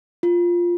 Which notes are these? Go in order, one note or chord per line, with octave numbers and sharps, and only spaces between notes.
F4